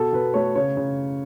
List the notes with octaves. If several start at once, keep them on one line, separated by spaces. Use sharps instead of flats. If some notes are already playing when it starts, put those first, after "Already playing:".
Already playing: B2 A4
B2 B4
A3 C#5
C#3 C#5
C#3